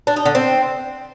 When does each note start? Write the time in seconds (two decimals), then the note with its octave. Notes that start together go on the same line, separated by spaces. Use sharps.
0.07 D4
0.16 D#4
0.26 D3
0.35 C4